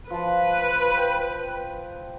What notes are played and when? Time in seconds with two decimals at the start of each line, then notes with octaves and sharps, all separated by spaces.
0.10 F3 B4 A5
0.97 G5